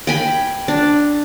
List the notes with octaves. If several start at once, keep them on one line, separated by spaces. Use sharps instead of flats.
G5 G#5 B5
D4